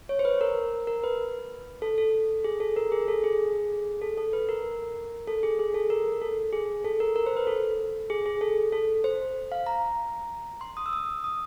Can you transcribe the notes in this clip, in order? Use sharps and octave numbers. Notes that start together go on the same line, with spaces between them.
C#5
C5
B4
A#4
A#4
B4
A4
A4
G#4
A4
A#4
G#4
A4
G#4
A4
A4
B4
A#4
A4
G#4
G#4
A4
A#4
A4
G#4
A4
A#4
A#4
C5
B4
A4
G#4
G#4
A4
A4
C5
F5
A#5
C6
D#6
E6
D#6
D#6